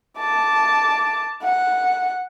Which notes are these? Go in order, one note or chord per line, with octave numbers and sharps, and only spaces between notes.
A5 D6
F#5